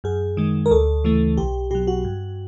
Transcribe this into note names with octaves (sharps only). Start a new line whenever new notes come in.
F#2 G#4
D#3 G#3
A#4
D2 A4
C#3 E3 A3
B1 G4
B2 F#3 G4
F#4
G2